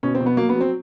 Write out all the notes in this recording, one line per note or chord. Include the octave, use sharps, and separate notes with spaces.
B2 C#4
C4
B2
B3
F#3 A#3
B3
F#3
C4